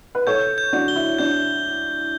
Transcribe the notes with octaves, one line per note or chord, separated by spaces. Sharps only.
B4
A4 C#5 G6
G6
D4 F#4
G7
E4
D4 G6